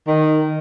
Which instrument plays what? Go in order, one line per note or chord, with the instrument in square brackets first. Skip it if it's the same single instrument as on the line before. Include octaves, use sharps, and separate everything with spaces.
[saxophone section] D#3